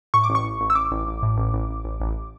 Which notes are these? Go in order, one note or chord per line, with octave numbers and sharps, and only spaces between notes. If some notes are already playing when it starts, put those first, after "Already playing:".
A2 C#6
D6
A1
C#6
A1
A1
E6
A1 D6
A1
A1
A2
A1
A1
A1
A1
A1